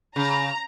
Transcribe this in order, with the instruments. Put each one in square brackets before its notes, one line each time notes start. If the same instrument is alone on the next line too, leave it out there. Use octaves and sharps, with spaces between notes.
[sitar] C#3 [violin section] A#5